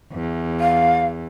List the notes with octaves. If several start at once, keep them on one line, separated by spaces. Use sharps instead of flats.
E2
F5